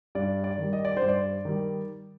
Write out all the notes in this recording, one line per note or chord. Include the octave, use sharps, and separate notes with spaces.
G2 D5
D5
D#3 G3
D#5
D5
G2 C5
D5
D#3 G3